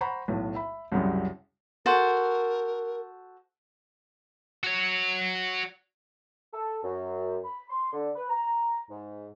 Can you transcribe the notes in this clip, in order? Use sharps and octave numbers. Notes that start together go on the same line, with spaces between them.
C5 F#5 A#5 B5 C#6
B1 A2
E5 B5
C2 F#2 C#3 F#3 G3
F#4 A4 A#4 C5
F#4 C#5
A4
F#2
B5
C6
D3
B4
A#5
G#2